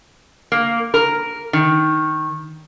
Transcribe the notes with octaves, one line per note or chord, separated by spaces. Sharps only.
A#3
A#4
D#3